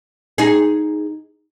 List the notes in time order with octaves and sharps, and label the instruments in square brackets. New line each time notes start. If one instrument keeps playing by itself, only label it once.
[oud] D#4 G#4